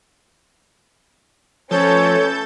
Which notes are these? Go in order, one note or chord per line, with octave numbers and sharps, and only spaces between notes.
F3 A3 C#4 A4 B4 C#5 G6 A6